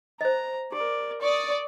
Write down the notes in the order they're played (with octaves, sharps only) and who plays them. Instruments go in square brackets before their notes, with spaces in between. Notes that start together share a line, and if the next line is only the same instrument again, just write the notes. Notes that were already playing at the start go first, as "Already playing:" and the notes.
[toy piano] C5 D#5 [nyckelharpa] A#5
[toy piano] G4 [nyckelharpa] A#4 D5
[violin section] D5 [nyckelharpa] C#6 D#6